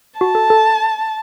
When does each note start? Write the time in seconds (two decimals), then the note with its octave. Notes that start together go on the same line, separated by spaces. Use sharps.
0.20 F#4 A5
0.35 A4
0.50 A4